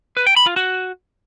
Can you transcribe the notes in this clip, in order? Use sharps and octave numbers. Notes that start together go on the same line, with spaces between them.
B4
G5
B5
F4
F#4